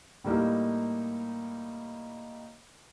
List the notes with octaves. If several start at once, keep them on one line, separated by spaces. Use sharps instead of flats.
A2 G3 A#3 D#4